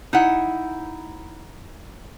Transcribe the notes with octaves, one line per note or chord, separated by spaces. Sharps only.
D#4 E4 F#5